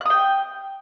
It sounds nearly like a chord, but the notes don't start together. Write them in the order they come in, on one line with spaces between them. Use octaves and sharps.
F#6 D#6 G5